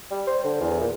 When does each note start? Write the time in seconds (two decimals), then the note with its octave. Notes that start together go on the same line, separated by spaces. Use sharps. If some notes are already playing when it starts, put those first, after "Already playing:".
0.11 G3
0.27 C5
0.45 D3
0.61 E2
0.81 A#2